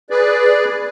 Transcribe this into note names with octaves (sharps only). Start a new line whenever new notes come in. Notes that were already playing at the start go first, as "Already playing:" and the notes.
G#4 B4 D5